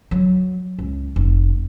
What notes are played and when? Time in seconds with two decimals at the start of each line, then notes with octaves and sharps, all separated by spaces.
0.11 F#3
0.79 C#2
1.16 F1